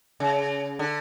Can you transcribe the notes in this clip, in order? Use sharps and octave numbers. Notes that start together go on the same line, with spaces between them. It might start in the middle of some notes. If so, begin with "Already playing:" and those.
C#3
D3